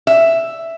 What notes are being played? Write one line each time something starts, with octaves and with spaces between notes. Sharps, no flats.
E5